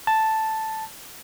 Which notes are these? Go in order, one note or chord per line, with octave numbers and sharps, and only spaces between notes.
A5